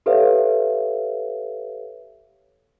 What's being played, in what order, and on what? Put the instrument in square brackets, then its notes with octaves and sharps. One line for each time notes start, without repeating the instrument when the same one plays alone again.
[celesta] G4 A4 B4 C#5 E5 F5